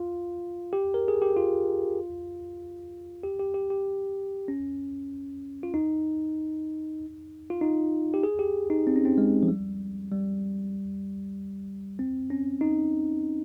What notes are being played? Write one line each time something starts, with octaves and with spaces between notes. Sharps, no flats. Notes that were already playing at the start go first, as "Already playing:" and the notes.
Already playing: F4
G4
A#4
G#4
G4
F4
G4
G4
G4
G4
C#4
F4
D#4
F4
D#4
G4
G#4
G4
D#4
C4
C#4
C4
G#3
F3
G3
G3
C4
C#4
D#4